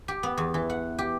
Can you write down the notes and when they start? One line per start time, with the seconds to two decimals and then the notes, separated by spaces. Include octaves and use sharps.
0.08 G4
0.23 B3
0.37 E2
0.54 E3
0.70 F#5
0.99 G4